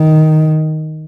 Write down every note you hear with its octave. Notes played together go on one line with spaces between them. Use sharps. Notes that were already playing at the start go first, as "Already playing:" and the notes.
Already playing: D#3